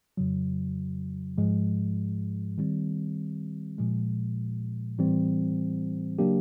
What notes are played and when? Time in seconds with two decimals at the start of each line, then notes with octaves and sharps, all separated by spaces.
0.17 F2 C#3 F#3
1.38 G#2 F3 G#3
2.58 D#3 G3 C4
3.78 A#2 F3 G#3
4.98 A2 E3 G3 C4
6.19 C#3 F#3 A#3 D4 G4